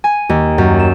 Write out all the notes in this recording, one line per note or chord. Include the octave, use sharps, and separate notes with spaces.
G#5
D#2
F#2
E7